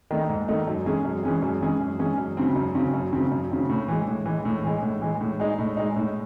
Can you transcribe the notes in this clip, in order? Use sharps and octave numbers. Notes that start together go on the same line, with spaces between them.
D#3 A3 D#4
G#2
D#3 A3 D#4
F#2
E3 G#3 C#4 G#4
F#2
E3 G#3 C#4 G#4
F#2
E3 G#3 C#4 G#4
F#2
E3 G#3 C#4 G#4
F#2
C#3 F#3 C4
F#2
C#3 F#3 C4
F#2
C#3 F#3 C4
F#2
C#3 F#3 C4
A2
E3 G#3
A2
E3 G#3
A2
E3 G#3
A2
E3 G#3
A2
G#3 D#4
A2
G#3 D#4
A2